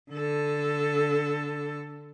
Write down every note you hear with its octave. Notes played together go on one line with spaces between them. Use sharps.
D3 A4